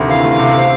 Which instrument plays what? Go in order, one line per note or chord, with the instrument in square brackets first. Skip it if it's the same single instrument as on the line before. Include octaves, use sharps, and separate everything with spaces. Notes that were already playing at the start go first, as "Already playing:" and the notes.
Already playing: [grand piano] D2 C3 D#3 A3
[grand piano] E3 [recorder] F5
[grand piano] A3
C3
C4